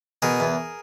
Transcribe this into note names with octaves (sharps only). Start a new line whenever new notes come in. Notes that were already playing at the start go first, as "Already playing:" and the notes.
B2 G#4 A#4
E2